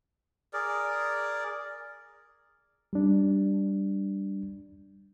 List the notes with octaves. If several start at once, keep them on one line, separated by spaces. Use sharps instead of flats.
G#4 A#4 D5
G3 D4